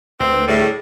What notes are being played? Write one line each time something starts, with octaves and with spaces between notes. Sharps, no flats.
D2 C4 B4
A2 G3 G#4